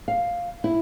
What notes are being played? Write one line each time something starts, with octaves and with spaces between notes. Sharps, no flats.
F5
E4